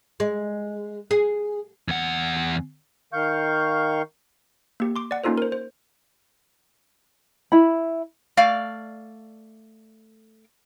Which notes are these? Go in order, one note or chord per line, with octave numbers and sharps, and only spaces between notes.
G#3
G#4
E2 F#5
D#3 F5 C#6 G6
A#3 G4
C6 D6
D5 F#5
A#3 C#4 D#4 F4 A4 C5
A#4 C5
C5
E4 B5
A3 D5 F5